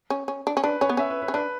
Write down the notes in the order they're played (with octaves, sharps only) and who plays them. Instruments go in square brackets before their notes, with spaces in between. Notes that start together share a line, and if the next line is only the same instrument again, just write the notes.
[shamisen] C#4
C#4
D4
C#4
[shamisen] D4 [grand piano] B4
[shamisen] C#4 [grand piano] C#5
[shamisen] B3
[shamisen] C#4 [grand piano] E5
[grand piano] B4
B4
[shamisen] C#4
[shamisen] D4 [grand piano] B4